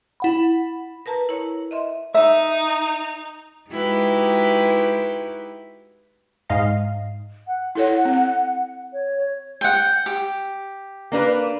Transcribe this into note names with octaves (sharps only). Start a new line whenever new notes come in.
E4 F#5 B5
A#4 B4 A5 A#5
E4 C#5
D#5 E5 C6
D#4 E5 F7
G#3 D#4 E4 F#4 G4 B4
G#2 D#5 F5 C7
F#5
E4 A4 C#5
C4
C#5
F#5 G5
G4
A#3 D4 B4